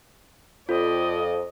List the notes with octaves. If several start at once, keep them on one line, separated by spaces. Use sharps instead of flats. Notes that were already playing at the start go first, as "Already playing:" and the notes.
F2 F4 D5 D#5